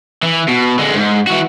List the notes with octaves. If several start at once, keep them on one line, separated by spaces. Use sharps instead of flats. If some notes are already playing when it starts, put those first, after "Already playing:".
E3
B2
D3 G#3
G#2
E3 F#4